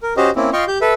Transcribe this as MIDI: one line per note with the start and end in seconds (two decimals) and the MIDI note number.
0.03 0.14 70
0.17 0.30 61
0.17 0.30 66
0.17 0.30 67
0.17 0.30 72
0.17 0.30 75
0.36 0.50 58
0.36 0.50 60
0.36 0.50 61
0.36 0.50 64
0.53 0.64 65
0.53 0.64 75
0.53 0.64 77
0.53 0.64 79
0.53 0.64 84
0.53 0.64 85
0.68 0.78 67
0.68 0.78 91
0.81 0.94 69
0.81 0.94 71
0.81 0.94 76